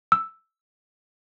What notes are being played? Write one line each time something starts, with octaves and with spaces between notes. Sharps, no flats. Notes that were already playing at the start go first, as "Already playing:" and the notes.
E6